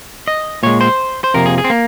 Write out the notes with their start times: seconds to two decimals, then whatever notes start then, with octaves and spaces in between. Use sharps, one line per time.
0.28 D#5
0.63 A#2 G#3 C#5
0.81 C5
1.24 C5
1.34 F2 C3 F3 A#3 A#4
1.46 G#4
1.58 G#4
1.64 C4
1.70 A#3